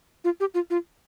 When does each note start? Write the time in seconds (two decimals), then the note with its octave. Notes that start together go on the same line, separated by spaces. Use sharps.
0.24 F4
0.40 G4
0.54 F4
0.70 F4